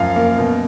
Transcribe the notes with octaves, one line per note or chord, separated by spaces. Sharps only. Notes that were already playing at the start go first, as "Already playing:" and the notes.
Already playing: F#2 F3 F5
A#3
B2